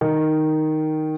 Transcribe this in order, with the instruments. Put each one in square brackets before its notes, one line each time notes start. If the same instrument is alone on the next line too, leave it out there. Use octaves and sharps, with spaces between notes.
[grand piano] D#3